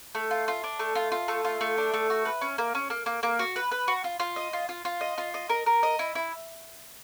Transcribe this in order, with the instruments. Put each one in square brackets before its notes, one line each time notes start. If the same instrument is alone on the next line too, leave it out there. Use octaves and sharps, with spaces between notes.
[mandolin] A3
F4
F4
D4
A3
F4
F4
A3
F4
A3
D4
A3
F#4
B4
C#4
A#3
C#4
A#3
A#3
A#3
F#4
B4
B4
F#4
F4
F4
D#5
F4
F4
F4
D#5
F4
D#5
A#4
A#4
D#5
E4
E4